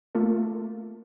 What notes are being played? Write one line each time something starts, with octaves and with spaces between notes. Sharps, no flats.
A3 A#3 F4 A4